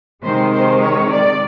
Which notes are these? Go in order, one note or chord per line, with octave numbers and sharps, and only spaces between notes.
C3 D#3 G#3 C5
C5
C#5
D5